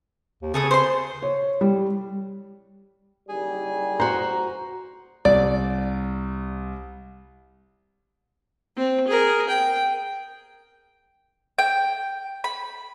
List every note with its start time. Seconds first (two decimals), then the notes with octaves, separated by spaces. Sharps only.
0.42 D#2
0.54 C#3 G#4 A4 D#6
0.71 C5 C6
1.23 C#5
1.61 G3
3.29 F#1 D#3 G3 G#4 G#5
4.00 F#4 C5 A#5
5.25 C2 D5
8.77 C4
9.08 G#4 A#4
9.49 G5
11.59 G5
12.44 B5